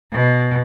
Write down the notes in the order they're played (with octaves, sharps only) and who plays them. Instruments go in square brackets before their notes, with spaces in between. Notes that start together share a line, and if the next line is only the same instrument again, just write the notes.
[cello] B2